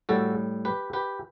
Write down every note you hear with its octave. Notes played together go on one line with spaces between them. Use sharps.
A2 G3 F#4 A4
G4 B4
G4 B4